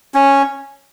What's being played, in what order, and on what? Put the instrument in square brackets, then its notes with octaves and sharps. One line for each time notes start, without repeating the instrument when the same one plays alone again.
[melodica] C#4